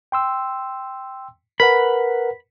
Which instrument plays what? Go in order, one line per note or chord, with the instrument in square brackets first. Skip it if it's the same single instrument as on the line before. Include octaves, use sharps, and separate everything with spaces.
[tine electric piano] G5 C6 E6
[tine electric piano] A#4 B4 F#5 [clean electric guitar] B5